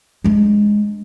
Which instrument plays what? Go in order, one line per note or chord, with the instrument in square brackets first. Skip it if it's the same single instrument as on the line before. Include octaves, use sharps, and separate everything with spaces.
[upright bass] G#3 D4